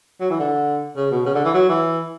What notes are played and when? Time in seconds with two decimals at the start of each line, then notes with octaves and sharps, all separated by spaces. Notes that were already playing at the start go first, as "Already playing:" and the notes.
0.21 F#3
0.30 E3
0.39 D3
0.96 C#3
1.11 B2
1.26 C#3
1.35 D3
1.45 E3
1.54 F#3
1.69 E3